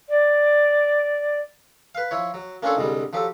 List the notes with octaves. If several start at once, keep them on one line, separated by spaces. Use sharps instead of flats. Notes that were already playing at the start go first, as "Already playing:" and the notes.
D5
B4 F5
F3 E4 C#5
F#3
A#3 C#4 D4 F4 A4 C#5
C2 G#2 D3 G3
F3 F#3 G4 A4